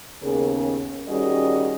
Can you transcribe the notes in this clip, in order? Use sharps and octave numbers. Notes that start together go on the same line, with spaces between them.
D#2 C#3 B3 C#4 G#4 A#4
D#3 G3 C#4 F#4 G#4 D#5